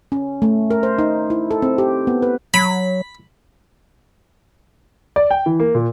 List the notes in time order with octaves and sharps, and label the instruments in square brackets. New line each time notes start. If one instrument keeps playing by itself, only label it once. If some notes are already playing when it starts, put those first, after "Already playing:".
[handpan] C#4
A3
A#4
C5
D#4
E4
A4
C4
G4
B3
B4
[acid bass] F#3 [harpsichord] B5
[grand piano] D5
G5
E3
A#3
A#2